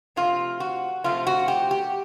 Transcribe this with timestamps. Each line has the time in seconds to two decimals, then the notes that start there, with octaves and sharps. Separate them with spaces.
0.16 C3 F3 A3 F4
0.60 F#4
1.04 C3 F3 A3 F4
1.27 F#4
1.48 G4
1.71 G4